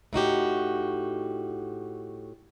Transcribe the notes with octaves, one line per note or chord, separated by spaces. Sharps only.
A2 D#4 F#4 G4